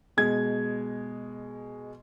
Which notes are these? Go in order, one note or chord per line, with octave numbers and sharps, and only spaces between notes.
B2 G#3 G#6